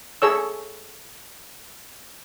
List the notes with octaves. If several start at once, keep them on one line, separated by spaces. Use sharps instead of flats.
G#4 A4 C#5 E6